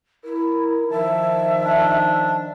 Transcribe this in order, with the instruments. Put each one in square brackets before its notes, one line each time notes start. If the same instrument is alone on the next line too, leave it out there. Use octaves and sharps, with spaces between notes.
[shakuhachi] E4 [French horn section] A#4
[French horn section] D#3 F3 [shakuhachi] E5 [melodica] A5
[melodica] D4